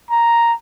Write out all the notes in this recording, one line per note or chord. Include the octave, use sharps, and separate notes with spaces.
A#5